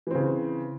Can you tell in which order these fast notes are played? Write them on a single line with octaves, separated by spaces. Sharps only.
E3 C4 C#3